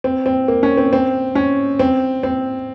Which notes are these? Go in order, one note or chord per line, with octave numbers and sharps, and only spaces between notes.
C4
C4
A#3
C#4
C4
C4
C#4
C4
C4